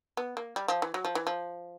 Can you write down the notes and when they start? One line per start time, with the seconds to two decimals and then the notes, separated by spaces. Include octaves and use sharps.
0.17 B3
0.37 A#3
0.56 G3
0.68 F3
0.82 E3
0.94 F#3
1.05 F3
1.15 E3
1.27 F3